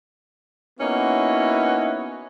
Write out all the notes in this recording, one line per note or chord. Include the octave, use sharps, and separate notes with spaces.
A#3 B3 C#4 D#4 E4 F#4